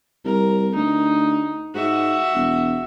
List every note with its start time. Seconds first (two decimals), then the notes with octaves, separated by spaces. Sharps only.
0.25 C2 A#4
0.75 D2 D#4
1.74 G#2 F#4 E5
2.34 E1